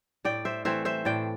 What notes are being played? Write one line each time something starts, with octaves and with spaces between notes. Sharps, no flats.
A2 D5 G5
C5 E5
E3 A3 C4 C5 E5
C5 E5
A2 D5 G5